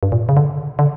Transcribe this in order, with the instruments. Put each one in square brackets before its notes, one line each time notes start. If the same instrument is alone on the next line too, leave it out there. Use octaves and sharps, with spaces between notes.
[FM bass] G2
A#2
C#3
D3
D3